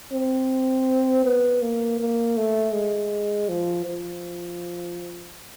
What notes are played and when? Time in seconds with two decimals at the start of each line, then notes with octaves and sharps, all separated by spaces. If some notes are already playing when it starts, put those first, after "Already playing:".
0.12 C4
1.24 B3
1.62 A#3
1.99 A#3
2.37 A3
2.74 G#3
3.49 F3
3.86 F3